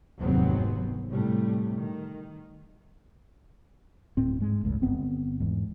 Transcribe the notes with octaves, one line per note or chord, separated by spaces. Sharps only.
F1 D#2 G#2 F#3 B3 C4
A2 C3 G3 A3
D#3
D1 A2 C4
G#2 G#3
G1 C#2 A2
G1 G#2 B3 C4
E2 G#2